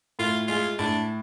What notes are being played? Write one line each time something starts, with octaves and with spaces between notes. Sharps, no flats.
A2 F4
G#3 F4
A2 D4